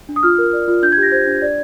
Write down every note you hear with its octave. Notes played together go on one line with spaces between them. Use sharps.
D4
D#6
F4 F6
A#4
D5
F4
D4 G6
G#6
G4
A#6
C5 G#6
D4
D5